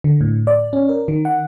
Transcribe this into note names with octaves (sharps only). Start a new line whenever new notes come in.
D3
A2
D5
C#4
A#4
D#3
F#5